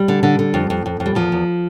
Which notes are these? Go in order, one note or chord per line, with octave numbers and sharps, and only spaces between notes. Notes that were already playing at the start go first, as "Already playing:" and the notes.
Already playing: G3
D3
D3
D3
F2
F2
F2
F2
G3
E2 F3
E2